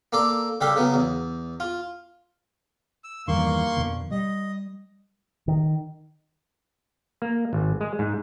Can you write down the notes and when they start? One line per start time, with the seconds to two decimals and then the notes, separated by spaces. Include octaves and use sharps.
0.13 A#3 A4 D5
0.61 C#3 G3 G4 A4 F5
0.76 C#3 F#3 B3
0.94 E2
1.60 F4
3.04 E6
3.28 E2 G2 D#3 A#3 C6 C#6
3.77 F2 B2 D3
4.11 G3 D#5
5.48 D#3
7.22 A#3
7.53 G#1
7.81 G#3
7.99 G#2